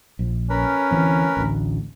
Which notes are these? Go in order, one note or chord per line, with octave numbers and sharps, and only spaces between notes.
A#1
C#4 A#4 B4
D2 E3 C4
A1 D2